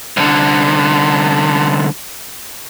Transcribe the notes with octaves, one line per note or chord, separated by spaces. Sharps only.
C2 D3